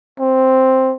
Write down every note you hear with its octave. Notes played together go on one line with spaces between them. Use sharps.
C4